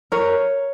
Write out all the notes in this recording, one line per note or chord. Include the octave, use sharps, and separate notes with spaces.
A#4 C#5